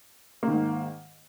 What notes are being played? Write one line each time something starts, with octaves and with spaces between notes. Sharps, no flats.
G#2 D#3 A#3